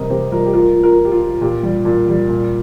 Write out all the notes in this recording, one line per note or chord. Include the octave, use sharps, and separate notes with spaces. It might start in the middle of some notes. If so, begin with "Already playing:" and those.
Already playing: C3 G3 G4 A#4 C5 D#5
C3 G4 C5
G3 F4 A#4
G4
F3 F4 A#4
F3
F4 A#4
F3
G4
F4
F3
A#2 G4
G3
A#2
G3
A#2